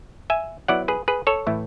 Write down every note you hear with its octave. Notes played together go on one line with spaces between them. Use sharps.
E5 G#5
F#3 B3 E4 D5 F#5
G#4 B4
G#4 B4
A4 C#5
A2 E3 A3 E4